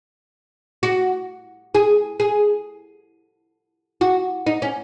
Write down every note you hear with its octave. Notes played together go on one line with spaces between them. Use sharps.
F#4
G#4
G#4
F#4
D#4
C#4